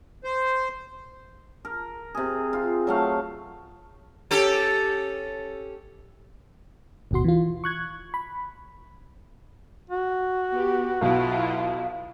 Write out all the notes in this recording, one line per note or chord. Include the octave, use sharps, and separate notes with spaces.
C5
A#4
C3 G#4
F4
F#3 A3 F5
C#4 G4 A4
G1 D#2 B2 F#4 C6
E3 F4
C#6 F#6 G#6
B5
F#4
B3 G4
B1 B2 E4 F4 F5